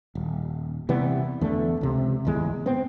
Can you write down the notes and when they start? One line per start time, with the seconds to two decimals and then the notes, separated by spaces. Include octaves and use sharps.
0.15 D#1
0.89 C3 E3 G3 B3
1.41 E2 D3 A3
1.81 C#2 C3
2.25 D1 G#1 E2 G#3
2.66 B3 C4